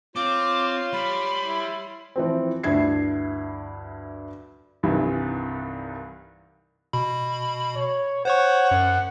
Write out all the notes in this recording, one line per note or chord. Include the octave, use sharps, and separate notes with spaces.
C4 F4 C#5 C6 D6
G3 B5
E4
E3 F3 C4
D2 G2 E4 G#6 C7
C2 G2 D#3 E3
B2 B5
C#5
C5 C#5 F#5 C#6
F#2